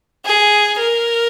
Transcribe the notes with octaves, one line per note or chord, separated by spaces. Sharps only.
G#4
A#4